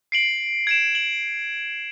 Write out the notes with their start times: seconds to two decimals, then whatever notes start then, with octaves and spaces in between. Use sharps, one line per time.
0.12 C7 D7 F#7
0.67 G#6 D7 E7
0.95 F#7